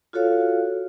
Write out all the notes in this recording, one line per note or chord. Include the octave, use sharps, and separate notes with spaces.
F4 F#4 A4 C#5 F5